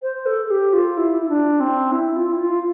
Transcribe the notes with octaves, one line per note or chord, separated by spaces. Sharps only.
C5
A4
A4
G4
F4
E4
E4
D4
C4
E4
F4
E4
F4